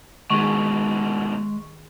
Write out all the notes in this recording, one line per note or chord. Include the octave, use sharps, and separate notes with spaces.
G#2 B2 D#3 G#3 G#4 C#6